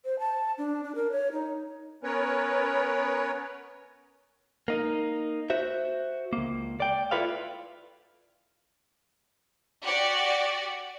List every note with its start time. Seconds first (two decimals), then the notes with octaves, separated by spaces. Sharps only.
0.05 C5
0.19 A5
0.58 D4
0.84 D4
0.95 A#4
1.11 C#5
1.32 D#4
2.03 B3 C#4 A#4 B4 C#5
4.68 A#3 D#4
5.50 F#4 C5 E5
6.33 C#2 A#3
6.80 D5 G5
7.11 E4 F4 A4 B4 D5 F5
9.82 F#4 G4 D5 F#5